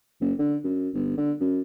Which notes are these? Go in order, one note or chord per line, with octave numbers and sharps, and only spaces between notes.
F#1
D3
F#2
G1
D3
F#2